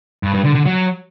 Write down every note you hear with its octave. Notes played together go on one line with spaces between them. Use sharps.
G2
G2
D3
D3
F#3